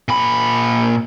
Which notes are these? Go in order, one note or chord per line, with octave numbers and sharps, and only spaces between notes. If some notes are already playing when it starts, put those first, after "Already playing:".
A#2 B5